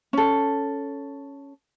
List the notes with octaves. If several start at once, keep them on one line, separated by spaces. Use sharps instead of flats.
C#4 A4